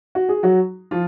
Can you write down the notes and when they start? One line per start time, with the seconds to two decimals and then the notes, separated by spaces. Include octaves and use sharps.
0.15 F#4
0.29 G#4
0.43 F#3 F#4
0.91 F3 F4